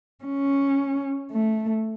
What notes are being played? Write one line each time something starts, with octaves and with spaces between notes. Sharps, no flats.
C#4
A3